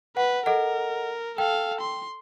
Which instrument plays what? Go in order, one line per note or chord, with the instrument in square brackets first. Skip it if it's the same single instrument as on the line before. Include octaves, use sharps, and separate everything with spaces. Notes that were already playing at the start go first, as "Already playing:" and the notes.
[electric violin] B4 [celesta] F#5
[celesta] A4 D#5 F#5 [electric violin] A#4
[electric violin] A4 F5 [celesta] G5
[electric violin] C6